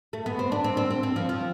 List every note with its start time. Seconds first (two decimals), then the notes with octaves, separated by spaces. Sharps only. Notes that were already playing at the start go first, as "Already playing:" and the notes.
0.13 A3
0.26 B3
0.39 C4
0.52 D4
0.64 C4
0.77 C4
0.90 C4
1.03 C4
1.16 F3
1.29 F3